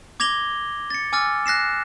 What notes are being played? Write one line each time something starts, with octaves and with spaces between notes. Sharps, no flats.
D6 G#6 A#6 F7 G7
A6 C#7
G#5 D6 E6 F6 A6
F#6 A#6 C7 E7